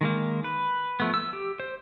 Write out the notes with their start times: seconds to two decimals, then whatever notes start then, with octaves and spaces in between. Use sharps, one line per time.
0.01 D#3 G#3 A#3
0.44 B4
1.00 F3 A3 B3
1.14 E6
1.33 G4
1.60 C5